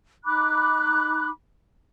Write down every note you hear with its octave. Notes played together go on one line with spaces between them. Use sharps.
D#4 B5 D6 F#6